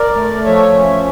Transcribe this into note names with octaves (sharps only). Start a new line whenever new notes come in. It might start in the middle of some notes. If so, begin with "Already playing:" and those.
Already playing: A#4 D5
A3
F3 C#5 E5
C#4